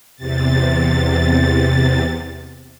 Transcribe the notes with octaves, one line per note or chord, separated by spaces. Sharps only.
E2 C3 A6